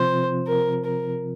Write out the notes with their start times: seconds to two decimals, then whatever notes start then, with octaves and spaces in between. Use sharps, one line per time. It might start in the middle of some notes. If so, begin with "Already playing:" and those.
Already playing: C3 F3 C4 F4 C5
0.47 A#4
0.85 A#4